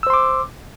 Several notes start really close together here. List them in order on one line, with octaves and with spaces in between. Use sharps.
E6 C5 C6 D6